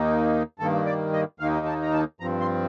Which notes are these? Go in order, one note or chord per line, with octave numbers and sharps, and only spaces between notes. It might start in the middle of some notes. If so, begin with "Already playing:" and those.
Already playing: D#2 D#3 A#3 D#4
G2 D#3 A#3 A4
D5
D#5
D#2 D#3 A#3 D#4 F5
A5
A#5
A5
G2 F3 C4 A#5
C6